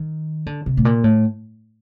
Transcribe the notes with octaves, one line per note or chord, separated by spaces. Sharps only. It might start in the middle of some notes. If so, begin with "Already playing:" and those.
Already playing: D#3
D3
C3
A2
A#2
A2